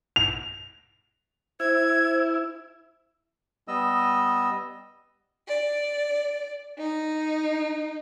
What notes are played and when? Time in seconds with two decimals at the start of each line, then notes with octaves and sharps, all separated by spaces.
0.16 F7
1.60 E4 C5 G#6
3.68 G3 B3 D#5 E6
5.47 D5
6.78 D#4